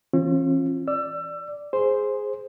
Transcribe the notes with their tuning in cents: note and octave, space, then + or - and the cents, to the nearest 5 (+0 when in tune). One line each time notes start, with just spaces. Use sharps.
E3 +0 C#4 -45 F4 +5
D5 -5 E6 +30
G#4 +0 C5 +0